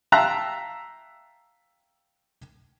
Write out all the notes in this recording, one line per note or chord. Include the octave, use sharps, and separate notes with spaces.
E5 F5 G5 A5 A#5 F#6